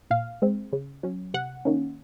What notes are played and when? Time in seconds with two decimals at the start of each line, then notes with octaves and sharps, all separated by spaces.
0.10 A#2 F5
0.42 G#3 C4
0.73 C#3
1.03 F#3 C#4
1.34 C3 F#5
1.65 D#3 A#3 C#4